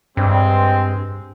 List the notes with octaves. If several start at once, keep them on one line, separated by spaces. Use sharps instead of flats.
G2 G#3 C4